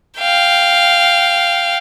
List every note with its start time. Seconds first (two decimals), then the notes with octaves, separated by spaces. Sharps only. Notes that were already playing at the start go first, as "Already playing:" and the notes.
0.18 F5 G5